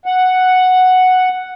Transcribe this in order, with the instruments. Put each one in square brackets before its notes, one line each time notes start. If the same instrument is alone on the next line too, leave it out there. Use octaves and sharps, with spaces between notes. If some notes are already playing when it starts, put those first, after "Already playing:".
[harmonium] F#5